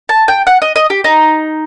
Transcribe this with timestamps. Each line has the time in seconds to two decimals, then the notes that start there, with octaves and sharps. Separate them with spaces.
0.09 A5
0.28 G5
0.47 F#5
0.62 D#5
0.76 D#5
0.90 G4
1.04 D#4